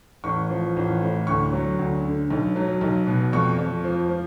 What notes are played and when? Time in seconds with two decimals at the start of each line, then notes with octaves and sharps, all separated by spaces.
0.24 A1 C#6
0.50 F3
0.76 A1
1.01 A2
1.27 D2 C#6
1.53 F#3
1.79 D2
2.05 D3
2.30 B1
2.56 F#3
2.81 B1
3.07 B2
3.33 F2 C#6
3.58 F2
3.84 F3
4.09 F3